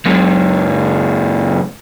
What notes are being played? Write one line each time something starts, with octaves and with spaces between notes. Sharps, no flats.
C#2 F#2